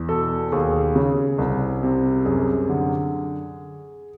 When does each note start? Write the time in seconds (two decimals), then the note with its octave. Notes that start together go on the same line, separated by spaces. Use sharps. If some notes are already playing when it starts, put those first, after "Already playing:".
Already playing: E2
0.09 B2 A4
0.52 D#2 G#4
0.96 C#3
1.38 C2
1.83 C3
2.25 F#2 G#4
2.69 D3